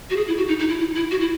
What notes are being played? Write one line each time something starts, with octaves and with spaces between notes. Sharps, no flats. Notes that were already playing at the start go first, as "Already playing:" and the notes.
F#4
G#4
E4
F#4
D#4
D#4
E4
E4
E4
F#4
E4